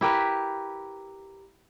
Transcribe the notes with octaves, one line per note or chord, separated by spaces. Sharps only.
E4 G4 A#4 B4